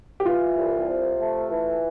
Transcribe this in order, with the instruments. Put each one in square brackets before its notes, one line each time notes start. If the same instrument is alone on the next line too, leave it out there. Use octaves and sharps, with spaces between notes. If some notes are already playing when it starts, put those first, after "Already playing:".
[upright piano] G4
[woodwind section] E3 [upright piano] F4
[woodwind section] C2
C3
A3
E3